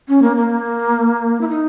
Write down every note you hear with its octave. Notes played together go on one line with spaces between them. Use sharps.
C#4
A#3
A#3
E4
D#4